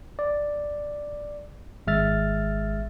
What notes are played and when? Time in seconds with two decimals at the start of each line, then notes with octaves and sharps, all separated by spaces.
0.19 D5
1.87 G#1 G#3 E5 F6 A6